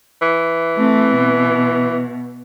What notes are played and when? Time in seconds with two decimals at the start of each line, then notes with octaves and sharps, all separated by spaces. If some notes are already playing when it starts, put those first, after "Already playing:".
0.22 E3
0.77 A3 C4
1.15 B2